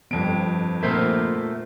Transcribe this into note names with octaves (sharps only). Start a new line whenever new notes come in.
G1 F2 C4 D7
A#2 A3 C4 A#4 C5 E5